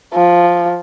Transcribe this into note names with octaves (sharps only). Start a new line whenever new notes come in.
F3